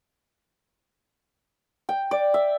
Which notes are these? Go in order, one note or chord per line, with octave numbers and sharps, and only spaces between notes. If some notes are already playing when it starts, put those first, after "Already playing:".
G5
D5
E5